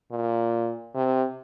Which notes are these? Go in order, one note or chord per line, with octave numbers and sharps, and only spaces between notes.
A#2
C3